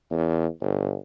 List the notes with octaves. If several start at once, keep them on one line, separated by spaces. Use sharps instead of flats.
E2
G1